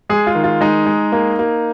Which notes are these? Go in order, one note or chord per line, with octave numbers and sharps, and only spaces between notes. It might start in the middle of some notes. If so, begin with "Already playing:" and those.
G#3 G#4
F4
D#3
F4
G#3 D#4
G#3
A#3
A#3